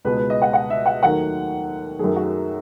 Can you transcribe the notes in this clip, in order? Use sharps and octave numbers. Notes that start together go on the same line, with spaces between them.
C#2 B2 G#3 B4
B4
D#5
F#5
F#5
E5
F#5
D#2 D#3 F#3 A3 F#5
F#2 D#3 F#3 A3 G#4
F#4